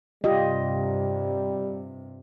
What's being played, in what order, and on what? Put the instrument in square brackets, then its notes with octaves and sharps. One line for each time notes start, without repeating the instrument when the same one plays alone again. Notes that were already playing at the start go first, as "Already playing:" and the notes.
[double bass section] G2 C3 [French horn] G3 [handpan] F4 G4 D#5